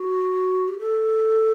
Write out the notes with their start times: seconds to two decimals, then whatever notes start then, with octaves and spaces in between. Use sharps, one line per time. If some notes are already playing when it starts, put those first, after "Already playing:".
Already playing: F#4
0.68 G4
0.79 A4